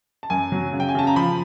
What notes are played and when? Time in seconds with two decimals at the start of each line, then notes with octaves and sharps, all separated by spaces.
0.23 A5
0.30 F#2 G#5
0.52 F#3
0.73 C#3
0.80 G5
0.89 G#5
0.95 C#3 A5
1.07 A#5
1.16 F3 B5